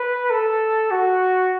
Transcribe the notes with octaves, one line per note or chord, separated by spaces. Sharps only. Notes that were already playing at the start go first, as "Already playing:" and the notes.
Already playing: B4
A4
F#4